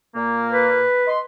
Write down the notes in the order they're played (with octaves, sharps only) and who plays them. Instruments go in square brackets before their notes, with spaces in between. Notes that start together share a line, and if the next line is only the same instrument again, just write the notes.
[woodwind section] A#2 A#3
[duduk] B4
[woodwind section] D#5 C6